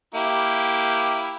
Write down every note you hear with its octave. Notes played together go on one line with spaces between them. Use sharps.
A#3 E4 G4